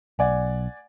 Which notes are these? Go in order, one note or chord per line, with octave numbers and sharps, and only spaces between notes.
B1 D5 F#5 G#5